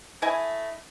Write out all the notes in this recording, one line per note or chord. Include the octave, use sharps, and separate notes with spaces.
A3 E4 D#5 G#5